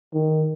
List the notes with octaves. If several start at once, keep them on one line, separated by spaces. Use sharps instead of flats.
D#3